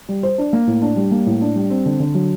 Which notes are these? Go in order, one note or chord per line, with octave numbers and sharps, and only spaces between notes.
G3
C5
D4
A#3
A2
D4
G3
A#3
A2
D4
G3
C4
D3
D3
F#3